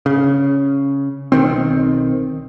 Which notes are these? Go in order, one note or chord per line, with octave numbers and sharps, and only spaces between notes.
C#3
B1 D#3 C4